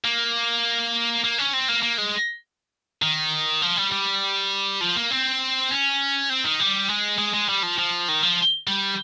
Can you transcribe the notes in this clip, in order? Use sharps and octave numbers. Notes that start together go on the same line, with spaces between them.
A#3
A#3
C#4
C4
A#3
A#3
G#3
D#3
F3
G3
G3
F3
A#3
C4
C#4
C4
D#3
G3
G#3
G#3
G#3
G3
F3
F3
D#3
F3
G3